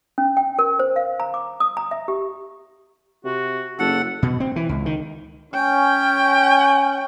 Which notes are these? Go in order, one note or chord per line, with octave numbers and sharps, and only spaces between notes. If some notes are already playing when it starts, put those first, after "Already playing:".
C#4
G5
A#4
C5
F5
A#5
D6
D#6
A#5
E5
G4
C3 F#4
F#1 A4 F#5
B2
C4
E3
C#2
D#3
C#4 G5